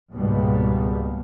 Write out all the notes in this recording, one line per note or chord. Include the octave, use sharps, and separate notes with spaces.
C#2 G#2 B2 G3 A#3 B3